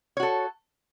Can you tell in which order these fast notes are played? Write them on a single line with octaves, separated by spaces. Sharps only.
C#5 F#4 A4